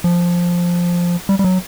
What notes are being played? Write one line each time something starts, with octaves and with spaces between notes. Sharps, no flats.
F3
G3
G3
F#3